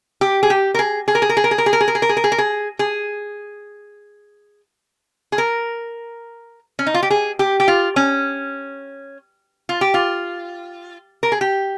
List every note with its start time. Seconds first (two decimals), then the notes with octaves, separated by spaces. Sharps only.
0.21 G4
0.43 G#4
0.50 G4
0.74 A#4
0.79 G#4
1.08 G#4
1.15 A#4
1.22 G#4
1.29 A#4
1.37 G#4
1.44 A#4
1.51 G#4
1.58 A#4
1.66 G#4
1.73 A#4
1.81 G#4
1.88 A#4
1.95 G#4
2.02 A#4
2.09 G#4
2.17 A#4
2.24 G#4
2.32 A#4
2.38 G#4
2.79 G#4
5.32 G#4
5.38 A#4
6.79 C#4
6.86 D#4
6.94 F4
7.03 G4
7.10 G#4
7.39 G4
7.60 G4
7.68 F4
7.96 C#4
9.69 F4
9.81 G4
9.94 F4
11.23 A#4
11.32 G#4
11.41 G4